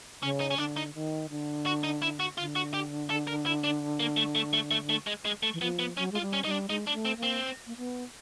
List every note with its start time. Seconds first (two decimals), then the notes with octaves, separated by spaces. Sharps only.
0.22 C#3 C#4
0.40 D#4
0.51 C#4
0.58 D3 D4
0.77 D#4
0.94 D#3
1.30 D3
1.66 F#4
1.84 D#4
2.02 E4
2.20 F#4
2.38 D3 F4
2.56 F#4
2.74 G4
3.10 A4
3.27 A#4
3.46 E4
3.64 D4
4.00 A#3
4.17 A3
4.35 A3
4.53 A3
4.71 A3
4.89 A3
5.07 G#3
5.25 G#3
5.43 A3
5.53 E3
5.61 F3 B3
5.79 B3
5.97 F#3 C#4
6.12 G#3 F4
6.21 G3
6.33 C#4
6.44 G3 D#4
6.51 D4
6.69 G#3 D#4
6.87 G#3 D4
6.93 A3
7.05 C4
7.17 A#3
7.23 C4
7.66 A#3
7.77 B3